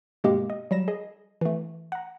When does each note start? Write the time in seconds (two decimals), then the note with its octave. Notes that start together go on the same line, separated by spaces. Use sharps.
0.24 G2 B2 G#3 A#3 G4
0.50 D#5
0.71 F#3 G3 A#6 E7
0.88 G#4 D#5
1.41 E3 A3
1.92 F#5 A#5